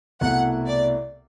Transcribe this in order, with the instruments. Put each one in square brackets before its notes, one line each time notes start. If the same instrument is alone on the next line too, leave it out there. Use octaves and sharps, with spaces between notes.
[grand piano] C2 B2 A3 E4 [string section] F#5
[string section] D5